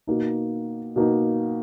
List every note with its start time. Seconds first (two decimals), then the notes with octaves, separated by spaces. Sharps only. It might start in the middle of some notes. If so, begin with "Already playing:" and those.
0.07 B2 A#3 D#4
0.96 B2 A#3 D#4